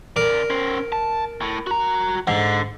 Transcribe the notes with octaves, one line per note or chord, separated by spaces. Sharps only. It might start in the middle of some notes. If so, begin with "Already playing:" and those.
C#3 A#4 D5
C#4 C5
A5
A2
F#4 A#5
G#2 D3